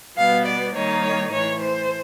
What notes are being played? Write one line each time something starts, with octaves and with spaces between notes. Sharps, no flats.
B2 G3 B3 F5
D5
D#3 G3 A#3 D#4 C#5
C#5
A2 E3 A3 C#5
C5